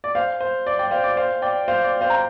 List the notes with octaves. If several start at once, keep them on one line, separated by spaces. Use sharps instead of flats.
D5
C5 F5
C5
D5
D5 G5
C5 F5
D5
C5 F5
D5 G5
C5 F5
D5
C5 F5
A#5